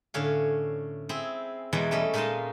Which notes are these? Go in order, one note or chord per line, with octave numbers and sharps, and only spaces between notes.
A2 D3 C#4 C#5 F5
C4 E4 G#4
E2 B2 E3 G#3 C#5 A#5
G3 A3 C#4 D#5
A#2 G#3 D#4 D#5 F5 A5